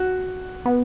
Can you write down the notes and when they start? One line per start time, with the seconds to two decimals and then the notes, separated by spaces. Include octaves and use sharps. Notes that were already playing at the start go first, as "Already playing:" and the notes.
Already playing: F#4
0.65 B3